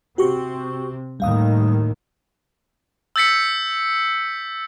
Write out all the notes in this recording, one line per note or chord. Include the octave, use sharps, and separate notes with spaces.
C3 C4 F#4 G4 C#6
D#2 A2 D#3 G3 F5 D#6
E6 G6 A6 B6 C#7